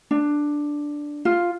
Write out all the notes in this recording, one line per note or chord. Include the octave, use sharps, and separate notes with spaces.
D4
F4